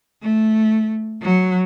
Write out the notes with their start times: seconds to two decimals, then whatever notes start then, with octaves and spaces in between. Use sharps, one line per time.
0.22 A3
1.21 F#3